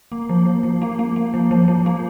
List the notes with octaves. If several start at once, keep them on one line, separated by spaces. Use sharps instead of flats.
A#3
F3
F3
F3
A#3
A#3
A#3
F3
F3
F3
A#3